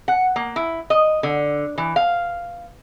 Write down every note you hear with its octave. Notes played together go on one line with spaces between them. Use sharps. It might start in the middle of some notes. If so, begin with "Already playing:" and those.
F#5
A#3
E4
D#5
D3
E3
F5